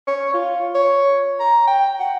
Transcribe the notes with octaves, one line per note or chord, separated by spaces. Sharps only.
C#5
F4
C#5
A#5
G5
F#5